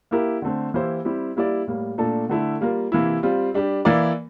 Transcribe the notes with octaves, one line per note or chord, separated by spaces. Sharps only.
A#3 E4 G4 A#4
D3 A3 C4
E3 A#3 E4 G4 C5
G3 C4 E4 G4
G3 A#3 E4 G4 D5
A2 G3 A#3
A#2 A3 D4 A4
D3 A3 E4
G3 A#3 F4 A#4
C3 E3 A#3 E4
G3 C4 F4
G3 D4 G4
E3 A#3 E4 A#4 D5